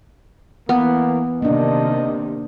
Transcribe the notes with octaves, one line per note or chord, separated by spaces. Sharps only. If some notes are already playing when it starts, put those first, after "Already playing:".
E3 A#3 B3
C3 D#3 A#3 D4 D#5